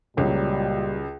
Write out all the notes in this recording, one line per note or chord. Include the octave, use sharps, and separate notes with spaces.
C#2 A#2 F#3 G3